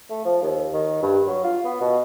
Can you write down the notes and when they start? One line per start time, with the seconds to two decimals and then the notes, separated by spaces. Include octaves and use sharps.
0.10 A3
0.25 F3
0.42 D#2
0.73 D#3
1.02 G2
1.27 F#3
1.44 F4
1.65 B3
1.81 B2